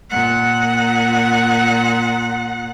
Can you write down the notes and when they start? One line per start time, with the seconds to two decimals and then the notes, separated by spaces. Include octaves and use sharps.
0.10 A#2 F#5